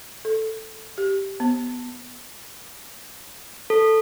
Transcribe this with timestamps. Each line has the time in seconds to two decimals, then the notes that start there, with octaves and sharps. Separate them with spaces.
0.25 A4
0.98 G4
1.40 B3
3.70 A4